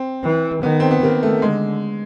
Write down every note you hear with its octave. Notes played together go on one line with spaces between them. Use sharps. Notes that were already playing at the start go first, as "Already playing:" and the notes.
Already playing: C4
E3
D#3 B3
C4
B3
D#3 A#3
A3
D3 G#3